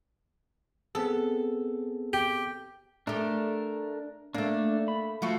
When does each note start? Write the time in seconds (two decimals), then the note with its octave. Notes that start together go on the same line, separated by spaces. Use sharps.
0.95 B3 C4 G#4 A4
2.13 G4
3.07 A3 D4 G4 A#4
4.34 A3 A#3 D4
4.88 B5
5.22 F3 A3 F4 F#4